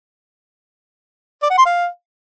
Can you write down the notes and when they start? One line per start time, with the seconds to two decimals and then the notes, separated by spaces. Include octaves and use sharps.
1.43 D5
1.50 F#5
1.58 C6
1.66 F5